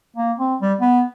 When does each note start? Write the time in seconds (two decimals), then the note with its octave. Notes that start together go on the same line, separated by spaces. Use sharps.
0.16 A#3
0.39 C4
0.61 G3
0.81 B3